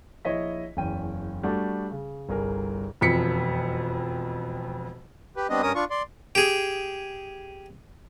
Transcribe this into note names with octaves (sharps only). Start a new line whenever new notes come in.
A#1 E4 C#5 D#5 B6
F#1 E2 C#4 G5 D#7
G3 A3 D4 F#4
C#3
G1 C2 G#4 A#4
E1 F2 B6 C#7
G4 B4
G3 B3 C4 D4 D#5
G2 C#4 A#4 D#6
D4 F4 C#6
D5 C6
G4 G#4